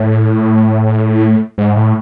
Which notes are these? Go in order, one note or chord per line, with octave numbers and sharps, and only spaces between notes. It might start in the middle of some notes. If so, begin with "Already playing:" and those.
Already playing: A2
G#2
A2